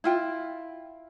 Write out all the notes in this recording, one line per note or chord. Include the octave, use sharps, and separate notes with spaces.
E4 F4 G5